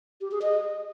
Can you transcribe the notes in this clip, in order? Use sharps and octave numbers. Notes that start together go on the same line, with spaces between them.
G4
G#4
D#5